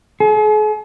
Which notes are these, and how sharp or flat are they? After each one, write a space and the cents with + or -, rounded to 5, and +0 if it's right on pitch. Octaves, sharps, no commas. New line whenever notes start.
G#4 +45